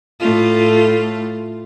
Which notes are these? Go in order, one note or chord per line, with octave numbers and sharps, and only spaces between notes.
A2 A3 F4